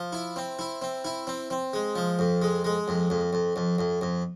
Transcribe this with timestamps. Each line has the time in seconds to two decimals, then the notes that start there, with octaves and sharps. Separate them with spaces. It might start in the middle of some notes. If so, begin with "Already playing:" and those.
Already playing: F3
0.13 E4
0.36 C4
0.59 E4
0.82 C4
1.05 E4
1.27 C4
1.50 C4
1.73 G#3
1.96 F3
2.19 F2
2.42 G#3
2.64 G#3
2.88 F2
3.10 F2
3.33 F2
3.56 F2
3.79 F2
4.01 F2